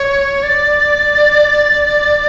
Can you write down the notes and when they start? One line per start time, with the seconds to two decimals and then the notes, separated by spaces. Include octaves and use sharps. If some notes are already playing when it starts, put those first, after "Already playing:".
Already playing: C#5
0.43 D5